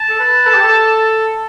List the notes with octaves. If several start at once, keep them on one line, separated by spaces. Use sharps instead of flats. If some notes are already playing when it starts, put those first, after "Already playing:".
Already playing: A5
A4
B4
A4
G4
A4